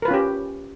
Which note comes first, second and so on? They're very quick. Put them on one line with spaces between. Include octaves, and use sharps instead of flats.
A#4 B4 F4 C#4 G4